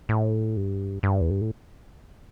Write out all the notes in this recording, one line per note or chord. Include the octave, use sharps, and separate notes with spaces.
A2
G2
G2
E2
G2
A2